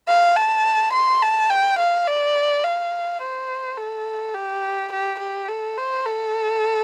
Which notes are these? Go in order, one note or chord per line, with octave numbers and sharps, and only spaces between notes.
F5
A5
C6
A5
G5
F5
D5
F5
C5
A4
G4
G4
G4
A4
C5
A4